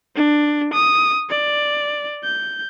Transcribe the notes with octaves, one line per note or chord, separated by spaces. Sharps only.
D4
D#6
D5
G6